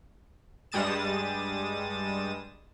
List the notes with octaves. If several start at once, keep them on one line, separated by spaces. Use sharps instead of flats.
G2 G3 G#3 D#6 A6 E7